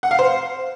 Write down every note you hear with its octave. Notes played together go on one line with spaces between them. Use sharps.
F#5
F5
C5